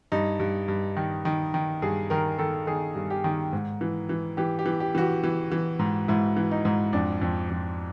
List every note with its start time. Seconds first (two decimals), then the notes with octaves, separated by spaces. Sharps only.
0.12 G2 D#4
0.40 G2
0.68 G2
0.96 D#3
1.25 D#3
1.54 D#3
1.82 G2 G#4
2.10 D#3 A#4
2.38 D#3 A4
2.67 D#3 G#4
2.95 G2
3.10 G4
3.24 D#3
3.53 G#2
3.81 E3
4.09 E3
4.37 E3 G4
4.59 G4
4.66 E3
4.80 G4
4.95 E3 F#4
5.01 G4
5.24 E3
5.52 E3
5.79 G#2
6.08 G#2 E4
6.37 E3
6.51 D#4
6.65 G#2
6.93 F2 D4
7.22 F2
7.50 F2